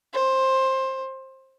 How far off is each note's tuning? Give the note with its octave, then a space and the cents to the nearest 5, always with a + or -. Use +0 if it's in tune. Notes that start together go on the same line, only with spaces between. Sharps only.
C5 +15